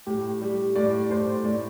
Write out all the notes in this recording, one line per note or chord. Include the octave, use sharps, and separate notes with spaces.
A2 G4
G3
A2 D5
A2 C5
A2 D5